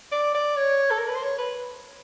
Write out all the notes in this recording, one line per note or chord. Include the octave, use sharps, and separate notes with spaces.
D5
D5
C#5
A4
A#4
B4
C5
C#5
B4